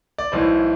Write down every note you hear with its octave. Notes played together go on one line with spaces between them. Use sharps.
D5
B1 A2 E3 C5